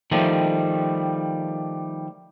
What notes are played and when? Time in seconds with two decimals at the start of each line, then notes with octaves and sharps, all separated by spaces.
0.11 D#3 F3 G3 A3